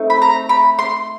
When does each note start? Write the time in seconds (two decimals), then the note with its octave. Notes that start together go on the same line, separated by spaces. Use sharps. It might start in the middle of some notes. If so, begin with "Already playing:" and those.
Already playing: A3 C4 D#4
0.10 B5
0.22 A#5
0.49 B5
0.79 C6